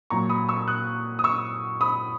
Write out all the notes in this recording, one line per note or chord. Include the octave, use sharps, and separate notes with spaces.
A#2 F#3 A#5 C#6
B5 D#6
C#6 E6
D#6 F#6
D#6
C#6 E6
B5 D#6